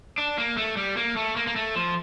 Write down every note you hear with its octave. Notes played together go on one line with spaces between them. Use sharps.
D4
A#3
A3
G3
A#3
A3
A#3
A#3
A3
F3